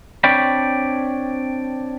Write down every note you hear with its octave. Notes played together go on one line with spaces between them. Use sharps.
C4 D4 C#5 D5 G5 B5